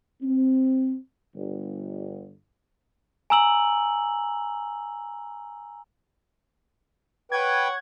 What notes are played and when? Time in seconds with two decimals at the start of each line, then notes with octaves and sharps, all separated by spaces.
0.22 C4
1.35 G1
3.30 G#5 A#5 E6 F#7
7.32 B4 C#5 F#5 G5 G#6